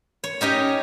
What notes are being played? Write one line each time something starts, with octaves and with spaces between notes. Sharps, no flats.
C#5
C#4 D#4 G4 D#5